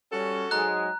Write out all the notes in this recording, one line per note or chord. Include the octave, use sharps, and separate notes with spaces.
G3 C#4 F#4 A4
G#2 F#3 G#3 A#5 F#6